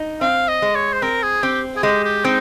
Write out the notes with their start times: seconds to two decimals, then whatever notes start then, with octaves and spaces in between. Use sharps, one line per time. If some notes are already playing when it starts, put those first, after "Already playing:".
Already playing: D#4
0.21 C4 F5
0.48 D#5
0.62 G#3
0.75 C#5
0.93 C5
1.02 C4 A#4
1.23 G#4
1.43 C4 G4
1.76 G#4
1.83 G#3 G4
2.04 G4
2.25 C4 D#4